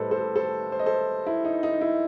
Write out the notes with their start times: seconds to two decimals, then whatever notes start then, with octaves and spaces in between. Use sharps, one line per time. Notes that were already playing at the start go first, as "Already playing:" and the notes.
Already playing: A2 G3 A4 B4 C5 D#5
0.11 A4 C5
0.36 A4 C5
0.72 C5
0.79 D#5
0.86 A4 C5
1.26 E4
1.45 D#4
1.63 D#4
1.81 E4